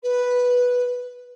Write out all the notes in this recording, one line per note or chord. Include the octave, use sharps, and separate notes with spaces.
B4